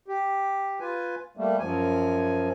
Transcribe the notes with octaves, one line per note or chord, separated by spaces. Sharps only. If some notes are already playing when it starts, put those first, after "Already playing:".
G4
F4 B4 G#5
G3 A3 A#3
F#2 F3 G#5